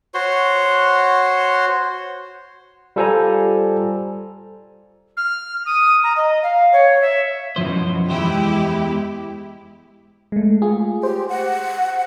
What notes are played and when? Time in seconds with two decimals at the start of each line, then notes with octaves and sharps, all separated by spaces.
0.14 F#4 C5 C#5 C6
2.96 G3 F4 A4 C5 G#5 A#5
5.16 F6
5.65 D#6
6.03 A#5
6.16 D#5
6.42 F5
6.72 C#5
7.01 E5
7.56 F#2 B2 F3 E4 C5
8.10 E2 E3 G#3 E4 G4 C5
10.32 G#3 A3
10.62 F4 G#4
11.03 G4 C5
11.29 F#5